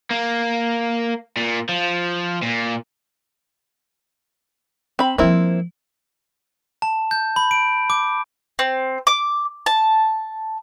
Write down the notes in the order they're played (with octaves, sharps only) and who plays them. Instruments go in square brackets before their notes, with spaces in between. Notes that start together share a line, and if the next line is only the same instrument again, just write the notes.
[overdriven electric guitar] A#3
A#2
F3
A#2
[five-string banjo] C4 B5
[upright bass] F3 G3 [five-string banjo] A#3 C4 E4
[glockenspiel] A5
G6
B5
D7
D6
[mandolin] C4
D6
A5